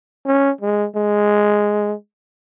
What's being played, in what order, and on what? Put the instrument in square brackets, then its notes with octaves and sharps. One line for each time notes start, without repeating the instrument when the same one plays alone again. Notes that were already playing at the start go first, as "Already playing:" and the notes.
[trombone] C#4
G#3
G#3